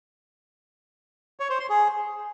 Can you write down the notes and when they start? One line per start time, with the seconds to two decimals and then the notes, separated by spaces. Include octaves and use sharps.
1.40 C#5
1.50 C5
1.60 C6
1.70 G#4